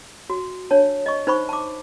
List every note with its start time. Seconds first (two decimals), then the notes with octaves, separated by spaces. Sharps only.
0.30 F#4
0.71 D4 C#5 A5
1.06 D#5 C#6
1.27 D#4 C5 B5 C#6
1.49 A5 D6